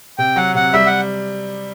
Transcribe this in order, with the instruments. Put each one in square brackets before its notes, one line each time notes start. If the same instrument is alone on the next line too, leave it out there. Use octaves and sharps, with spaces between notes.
[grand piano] C3 [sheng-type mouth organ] G5
[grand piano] F#3 [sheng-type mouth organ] F#5
[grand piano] C3 [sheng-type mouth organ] F#5
[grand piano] G3 [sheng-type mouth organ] E5
[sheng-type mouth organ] F#5